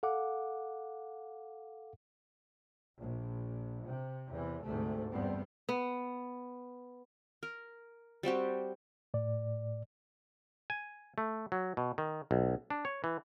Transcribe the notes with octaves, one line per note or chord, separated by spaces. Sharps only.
A4 F5 F#5 D6
A#1
C3
E2 C3 E3
D2 G#2 C3 A3
E2 G2 G3 B3 C4
B3
A#4
G3 C4 F#4 G4
A2 D5
G#5
A3
F#3
B2
D#3
B1
D4
C#5
E3